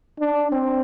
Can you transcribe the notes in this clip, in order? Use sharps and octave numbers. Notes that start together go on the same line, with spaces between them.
D4
C4